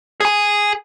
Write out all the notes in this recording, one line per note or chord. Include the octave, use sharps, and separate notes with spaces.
G#4 G#5